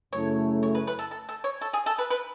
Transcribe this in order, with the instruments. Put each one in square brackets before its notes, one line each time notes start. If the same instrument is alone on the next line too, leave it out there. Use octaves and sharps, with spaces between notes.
[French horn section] F#2 C#3 F#3 A3 E4 [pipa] C#5
[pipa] C#5
B4
B4
A4
A4
A4
C#5
A4
G#4
A4
B4
B4